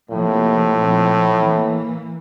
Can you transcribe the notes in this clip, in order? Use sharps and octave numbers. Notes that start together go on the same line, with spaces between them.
A2 C3 F3 A#3
A#2 F3 A3 C4
E3 A#3